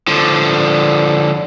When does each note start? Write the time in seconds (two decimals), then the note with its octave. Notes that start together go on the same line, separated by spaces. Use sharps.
0.07 D3 F3